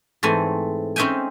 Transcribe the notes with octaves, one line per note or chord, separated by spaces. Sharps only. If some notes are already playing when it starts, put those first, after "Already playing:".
G#2 E3 A3 C4 G#5
C4 C#4 D#4 E5 G5 G#5